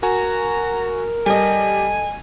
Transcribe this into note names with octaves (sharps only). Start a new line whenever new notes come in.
F#4 A#4 G#5 A#5
G3 A4 D#5 G#5